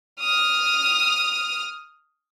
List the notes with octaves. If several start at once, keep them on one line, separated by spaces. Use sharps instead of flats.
D#6 F6